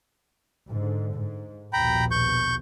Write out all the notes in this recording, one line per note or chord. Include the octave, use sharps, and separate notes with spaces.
G#2 D3
G#2
A#1 D#2 B2 G5 A#5 B5
C#6 G6